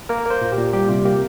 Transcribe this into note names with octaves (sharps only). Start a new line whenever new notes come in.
A#3 A#4
A#3 C5
A#2
G4
A#2
G3 G4
C3 F4
A#3 G4